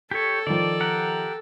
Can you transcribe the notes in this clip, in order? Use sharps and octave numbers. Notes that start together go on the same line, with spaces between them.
G4 A4 C#5
D#3 F3 D5
G4 A#4 F#5